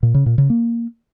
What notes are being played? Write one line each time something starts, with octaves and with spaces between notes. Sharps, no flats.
A#2
C#3
A#2
C#3
A#3